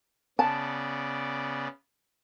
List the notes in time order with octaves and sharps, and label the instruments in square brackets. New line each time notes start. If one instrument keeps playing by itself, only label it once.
[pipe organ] C#3 B3 D5 [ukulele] A5